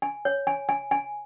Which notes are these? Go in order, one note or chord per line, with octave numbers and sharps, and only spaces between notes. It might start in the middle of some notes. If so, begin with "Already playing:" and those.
G#5
C#5
G#5
G#5
G#5